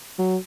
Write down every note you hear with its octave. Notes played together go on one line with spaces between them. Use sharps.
F#3